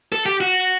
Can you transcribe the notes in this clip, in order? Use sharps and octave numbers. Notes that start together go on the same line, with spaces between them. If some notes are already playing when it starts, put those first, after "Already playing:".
A4
G4
F#4